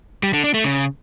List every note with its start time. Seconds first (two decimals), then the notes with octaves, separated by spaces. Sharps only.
0.23 G3
0.33 D3
0.44 D4
0.54 A3
0.64 C#3